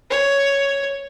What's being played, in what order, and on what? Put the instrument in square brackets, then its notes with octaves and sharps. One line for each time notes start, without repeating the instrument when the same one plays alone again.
[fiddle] C#5